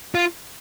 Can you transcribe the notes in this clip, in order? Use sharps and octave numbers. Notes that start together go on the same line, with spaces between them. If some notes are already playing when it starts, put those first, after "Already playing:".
F4